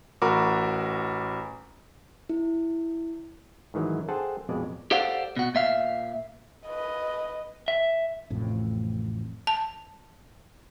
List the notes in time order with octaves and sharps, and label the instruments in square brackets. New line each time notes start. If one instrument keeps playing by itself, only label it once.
[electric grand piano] A1 F#4 A#4 A#5 B5 D6
[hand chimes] E4
[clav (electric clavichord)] G#2 D#3 E3 F#3
G#4 A4 C5 F#5 G5 A5
A#1 F2 B2 G#3 D5
[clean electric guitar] G4 A4 C5 D5 F5 F#5
B2 F#4
A#2 E5 F5
[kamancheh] B4 D#5
[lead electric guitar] E5
[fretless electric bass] A1 F2 A2 C3
[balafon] A5